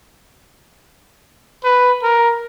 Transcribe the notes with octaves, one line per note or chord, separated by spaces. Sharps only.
B4
A#4